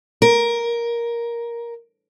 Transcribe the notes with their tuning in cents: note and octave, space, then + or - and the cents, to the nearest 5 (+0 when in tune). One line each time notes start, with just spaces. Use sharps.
A#4 +10